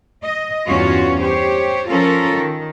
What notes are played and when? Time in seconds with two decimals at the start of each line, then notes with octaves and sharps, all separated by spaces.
0.23 D#5
0.67 E2 G2 C#4 F4 F#4 C#5
1.22 G4 C5 C#5
1.90 F3 C#4 F4 A4 A#4
2.35 D#3